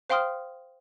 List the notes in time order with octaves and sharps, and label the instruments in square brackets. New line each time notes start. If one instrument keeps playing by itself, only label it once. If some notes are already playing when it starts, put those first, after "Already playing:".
[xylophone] C5 F5 G5 C6 D#6 F6